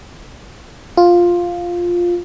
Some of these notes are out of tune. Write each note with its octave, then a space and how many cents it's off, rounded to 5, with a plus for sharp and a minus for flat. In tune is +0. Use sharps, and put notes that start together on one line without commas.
F4 +5